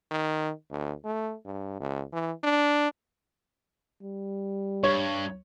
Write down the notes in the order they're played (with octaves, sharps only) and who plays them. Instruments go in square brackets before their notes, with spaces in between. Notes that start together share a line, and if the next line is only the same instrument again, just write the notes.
[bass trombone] D#3
D2
A3
G2
C#2
E3
D4
[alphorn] G3
[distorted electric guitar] G2 [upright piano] C#5